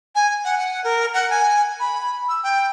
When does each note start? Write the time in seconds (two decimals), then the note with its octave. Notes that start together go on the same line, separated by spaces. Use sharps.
0.15 G#5
0.45 F#5
0.58 F#5
0.84 A#4
1.14 F#5
1.30 G#5
1.80 B5
2.29 E6
2.43 G5